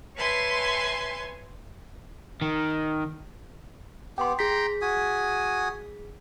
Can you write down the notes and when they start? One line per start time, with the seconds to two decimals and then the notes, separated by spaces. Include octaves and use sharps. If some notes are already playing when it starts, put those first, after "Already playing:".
0.17 B4 C#5 E5 G#5 A5 C6
2.42 D#3
4.18 B3 G4 G5 C6
4.39 G#4 G5 A#5 C6 B6
4.82 F#4 G#5 D#6